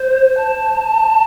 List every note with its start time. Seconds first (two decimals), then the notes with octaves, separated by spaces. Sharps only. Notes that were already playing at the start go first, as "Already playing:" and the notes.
Already playing: C5
0.37 A5